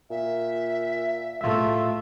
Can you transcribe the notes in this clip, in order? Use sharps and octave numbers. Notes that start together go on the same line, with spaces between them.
A#2 E5
A2 A3 F4 E5